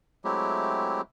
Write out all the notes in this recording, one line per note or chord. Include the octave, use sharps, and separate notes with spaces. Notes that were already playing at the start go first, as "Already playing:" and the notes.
F#3 G#3 A3 C4 E4 G4